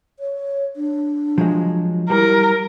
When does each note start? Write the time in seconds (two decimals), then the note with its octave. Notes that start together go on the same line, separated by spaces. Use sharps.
0.19 C#5
0.76 D4
1.38 F3 F#3 G#3
2.10 G3 E4 A#4